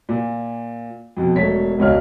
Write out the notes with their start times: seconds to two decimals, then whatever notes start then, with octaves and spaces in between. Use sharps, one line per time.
0.09 A#2
1.17 F2 B2
1.35 E1 A3 C#5 B6
1.78 E1 C#2 C#5 F6